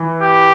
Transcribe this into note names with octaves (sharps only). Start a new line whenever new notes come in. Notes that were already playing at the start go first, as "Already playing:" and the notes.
Already playing: E3
G4